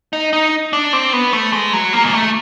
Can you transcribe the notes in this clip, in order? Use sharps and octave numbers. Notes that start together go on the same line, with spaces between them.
D#4
D#4
D4
C4
B3
A3
G#3
F#3
A#3
G#3
A3